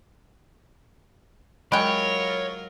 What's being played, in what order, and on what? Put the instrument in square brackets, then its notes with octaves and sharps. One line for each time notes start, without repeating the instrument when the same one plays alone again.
[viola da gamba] F#3 F4 A#4 [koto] G#3 G5 [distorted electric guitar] C#5 [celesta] B5 D7